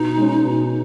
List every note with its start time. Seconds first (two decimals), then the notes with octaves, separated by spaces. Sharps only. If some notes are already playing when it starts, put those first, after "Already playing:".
Already playing: B2 D#4
0.17 G#3 C#4
0.44 B2